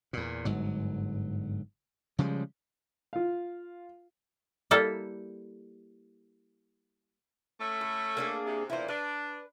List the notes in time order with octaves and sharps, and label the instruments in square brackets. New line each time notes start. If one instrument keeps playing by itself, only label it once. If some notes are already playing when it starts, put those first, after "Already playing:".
[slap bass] E2 A#2
G1 G#2 F#3
C#3 F3 G3 G#3
[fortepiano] F4 F5
[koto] G3 A#3 E4 A4
[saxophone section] A3 C#4 E5
[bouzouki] A2
A#3 D4 G#4
[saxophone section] C3
[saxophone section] E2 A#2 [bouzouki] E4 C5
[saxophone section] D4 [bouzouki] B4